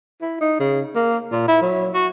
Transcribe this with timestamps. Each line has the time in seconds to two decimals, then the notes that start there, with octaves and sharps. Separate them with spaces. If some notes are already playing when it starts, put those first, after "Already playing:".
0.22 E4
0.41 D#4
0.60 C#3
0.95 A#3
1.32 A#2
1.48 E4
1.62 F#3
1.94 F#4